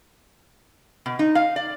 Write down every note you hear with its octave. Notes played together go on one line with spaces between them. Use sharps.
B2
D#4
F5
D5